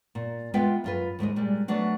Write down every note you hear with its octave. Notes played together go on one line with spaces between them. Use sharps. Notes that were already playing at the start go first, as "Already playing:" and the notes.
A#2
G#3 B3 F4 B4 E5 G5
F#2 F4 B4
D#2 G#2 G#3 D#5
A#2 G3 G#3
F#3 A3 B3 D4 F#4